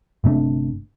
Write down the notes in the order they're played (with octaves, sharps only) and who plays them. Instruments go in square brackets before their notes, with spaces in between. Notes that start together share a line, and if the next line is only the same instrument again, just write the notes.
[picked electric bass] G1 C3 A3 D4